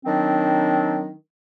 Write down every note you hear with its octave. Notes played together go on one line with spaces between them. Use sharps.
D#3 F#3 C4 D4